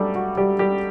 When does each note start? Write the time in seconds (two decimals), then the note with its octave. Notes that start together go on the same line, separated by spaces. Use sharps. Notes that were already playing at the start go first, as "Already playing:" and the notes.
Already playing: G2 F#3 G3 A3 G4 A4
0.15 F#4
0.37 G3 G4
0.59 G3 G4